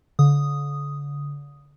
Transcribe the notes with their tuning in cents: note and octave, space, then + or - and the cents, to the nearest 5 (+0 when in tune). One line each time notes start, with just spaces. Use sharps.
D3 -40 D#6 +0